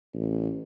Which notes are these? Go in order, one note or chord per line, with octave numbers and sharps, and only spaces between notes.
A1